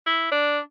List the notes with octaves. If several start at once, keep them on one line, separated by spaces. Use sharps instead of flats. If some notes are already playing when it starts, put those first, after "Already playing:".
E4
D4